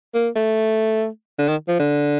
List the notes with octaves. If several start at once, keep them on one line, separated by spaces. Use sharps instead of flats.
A#3
A3
D3
D#3
F3
D3